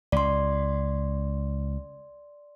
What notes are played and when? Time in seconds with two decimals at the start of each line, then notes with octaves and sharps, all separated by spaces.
0.12 C#2 D5 C6